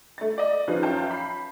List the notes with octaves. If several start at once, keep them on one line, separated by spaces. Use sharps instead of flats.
A3 A6
D5 D#5
F3 C#4 D#4 F4 G#4 B4
F#2 C#4 F4 G5 A5 G6
B5 C7